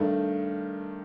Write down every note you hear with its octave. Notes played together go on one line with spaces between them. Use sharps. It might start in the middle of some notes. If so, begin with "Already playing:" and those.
Already playing: G2 D#3 A3